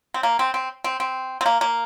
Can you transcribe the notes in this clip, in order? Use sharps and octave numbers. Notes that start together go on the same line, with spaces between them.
C4
A#3
C4
C4
C4
C4
C4
A#3
A#3